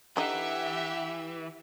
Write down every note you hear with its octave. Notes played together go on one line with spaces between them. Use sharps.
D3 E3 D#4 G4 E5 F#5